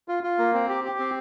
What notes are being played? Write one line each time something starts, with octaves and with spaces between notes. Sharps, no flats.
F4
F4
A#3
C4
G4
G4
C4